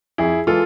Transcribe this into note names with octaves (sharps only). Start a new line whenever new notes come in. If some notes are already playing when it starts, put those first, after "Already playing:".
F2 E4 G#4
E3 G#3 F4 A4